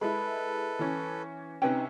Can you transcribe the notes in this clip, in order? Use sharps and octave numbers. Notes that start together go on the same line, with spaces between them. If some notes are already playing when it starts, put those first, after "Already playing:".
G#3 E4 A4 B4 B5
E3 C#4
C3 C#4 D#4 B4 G5